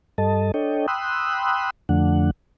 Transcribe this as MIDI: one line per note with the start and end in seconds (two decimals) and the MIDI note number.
0.18 0.52 43
0.18 0.52 55
0.18 0.52 69
0.18 0.52 75
0.18 0.52 81
0.54 0.86 62
0.54 0.86 69
0.54 0.86 73
0.54 0.86 75
0.54 0.86 79
0.88 1.70 79
0.88 1.70 83
0.88 1.70 84
0.88 1.70 87
0.88 1.70 88
0.88 1.70 90
1.89 2.31 41
1.89 2.31 50
1.89 2.31 53
1.89 2.31 57
1.89 2.31 62
1.89 2.31 78